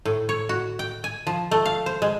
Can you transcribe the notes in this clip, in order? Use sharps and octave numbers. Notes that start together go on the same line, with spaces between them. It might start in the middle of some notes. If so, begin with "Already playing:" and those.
A2
C#5
F#4
G5
G#5
F3
A3
F5
C5
G#3